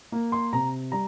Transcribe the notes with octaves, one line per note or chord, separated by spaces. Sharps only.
A#3
C6
C3 A#5
G3 A#5